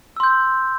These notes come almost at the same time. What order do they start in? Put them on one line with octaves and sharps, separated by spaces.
E6 C6 G6